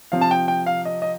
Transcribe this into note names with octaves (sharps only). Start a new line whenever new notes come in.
C3 F3 F5
A5
G5
G5
F5
D#5
D#5